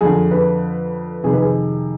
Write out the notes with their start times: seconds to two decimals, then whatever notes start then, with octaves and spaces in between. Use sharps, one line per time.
0.01 F2 D3 G#4
0.31 B4
1.24 F2 C3 D#3 G#4
1.33 B4
1.42 G#4